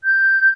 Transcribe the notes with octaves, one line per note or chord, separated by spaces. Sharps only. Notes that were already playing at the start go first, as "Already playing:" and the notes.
G6